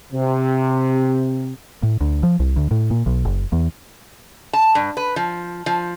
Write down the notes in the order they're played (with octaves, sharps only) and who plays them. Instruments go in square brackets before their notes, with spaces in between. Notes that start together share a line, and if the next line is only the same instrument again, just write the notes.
[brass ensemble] C3
[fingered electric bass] A2
D2
F3
C2
D2
A2
A#2
B1
F#1
E2
[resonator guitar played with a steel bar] A5
G2
B4
F3
F3